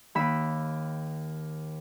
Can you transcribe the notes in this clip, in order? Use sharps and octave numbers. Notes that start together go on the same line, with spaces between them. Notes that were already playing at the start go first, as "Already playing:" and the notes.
D#2 B5 E6